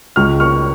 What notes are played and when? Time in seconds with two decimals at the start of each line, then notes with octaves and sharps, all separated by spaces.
0.16 C#2 C#6 F6
0.40 A#3 C#6 F6